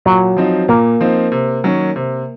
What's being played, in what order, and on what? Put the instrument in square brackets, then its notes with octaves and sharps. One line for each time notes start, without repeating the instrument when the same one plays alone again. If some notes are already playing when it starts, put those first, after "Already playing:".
[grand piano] A#2 [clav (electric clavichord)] F#3
[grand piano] F3 C4 D#4
[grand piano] A#2 [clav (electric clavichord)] A#3
[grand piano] F3 C4 D#4
C3
D#3 F#3 C#4
C3